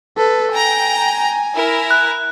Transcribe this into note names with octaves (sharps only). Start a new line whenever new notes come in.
A4 B4
G5 G#5 A#5
E4 A#4
F#6